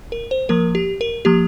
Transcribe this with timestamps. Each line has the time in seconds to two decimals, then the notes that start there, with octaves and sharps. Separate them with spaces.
0.12 A#4
0.31 C5
0.49 F3 A#3 A#4
0.75 G4
1.01 A#4
1.25 F3 A#3 G4